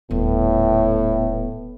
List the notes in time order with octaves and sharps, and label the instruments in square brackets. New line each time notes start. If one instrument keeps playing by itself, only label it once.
[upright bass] D#1 [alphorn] A2 [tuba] B3